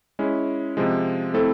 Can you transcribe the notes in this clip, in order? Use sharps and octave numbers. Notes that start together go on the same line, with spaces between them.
G#3 C#4 E4
C3 F3 G#3
A3 C4 E4 A4